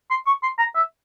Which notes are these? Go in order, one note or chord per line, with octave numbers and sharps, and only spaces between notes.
C6
C#6
C6
A#5
E5